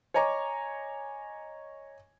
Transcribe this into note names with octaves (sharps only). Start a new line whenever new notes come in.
C#5 D#5 G#5 A#5 C#6 D6